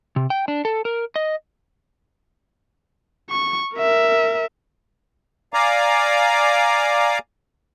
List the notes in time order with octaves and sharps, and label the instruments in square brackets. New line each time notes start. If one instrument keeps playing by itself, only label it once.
[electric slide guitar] C3
G5
D4
A4
A#4
D#5
[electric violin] C#6
A#4 E5
[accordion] D5 F5 G#5 A#5 D6